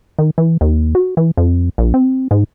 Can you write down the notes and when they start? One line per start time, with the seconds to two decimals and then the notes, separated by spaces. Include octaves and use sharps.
0.19 D#3
0.38 E3
0.61 D#2
0.95 F#4
1.17 E3
1.37 F2
1.78 A#1
1.94 C4
2.31 G#2